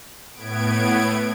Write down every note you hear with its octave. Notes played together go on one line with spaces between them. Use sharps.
A2 B3 G#6 D7